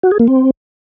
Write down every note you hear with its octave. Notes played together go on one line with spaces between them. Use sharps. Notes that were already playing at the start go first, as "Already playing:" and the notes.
F#4
G#4
A#3
C4